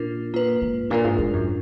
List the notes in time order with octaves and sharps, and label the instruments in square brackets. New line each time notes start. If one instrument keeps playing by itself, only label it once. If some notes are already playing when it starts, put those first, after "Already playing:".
Already playing: [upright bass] A#2 [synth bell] D4 F4 A#4
[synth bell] A#3 F4 B4
[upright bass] G#2
[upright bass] A#2 [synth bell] D4 F4 A#4
[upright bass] G#2
G#2
F#2